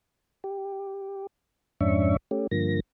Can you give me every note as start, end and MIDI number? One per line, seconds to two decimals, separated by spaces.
0.44 1.27 67
1.81 2.17 41
1.81 2.17 44
1.81 2.17 61
1.81 2.17 62
1.81 2.17 76
1.81 2.17 85
2.31 2.47 57
2.31 2.47 61
2.31 2.47 67
2.51 2.80 43
2.51 2.80 50
2.51 2.80 53
2.51 2.80 58
2.51 2.80 94